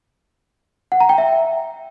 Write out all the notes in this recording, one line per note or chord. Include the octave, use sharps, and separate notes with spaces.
F#5
A#5
G5
E5